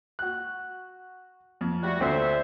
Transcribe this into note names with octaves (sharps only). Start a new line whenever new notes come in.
F#4 F#6
F2
G3 A3 F#4
D2 D3 C4 C5 E5